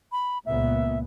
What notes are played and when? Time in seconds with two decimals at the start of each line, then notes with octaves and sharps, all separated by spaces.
0.12 B5
0.46 C#2 A#2 B3 E5